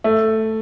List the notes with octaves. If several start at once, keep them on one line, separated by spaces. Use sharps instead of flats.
A3